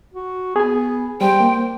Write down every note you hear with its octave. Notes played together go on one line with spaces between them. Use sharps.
F#4
B3 G#4 G#5
G3 C5 G5
A#3